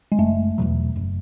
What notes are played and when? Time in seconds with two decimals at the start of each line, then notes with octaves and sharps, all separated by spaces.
0.12 G#3
0.18 F#1 A3
0.58 E2 B2 F#3
0.96 F#1